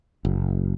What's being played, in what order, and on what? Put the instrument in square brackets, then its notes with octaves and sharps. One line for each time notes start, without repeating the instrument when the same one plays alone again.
[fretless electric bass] F#1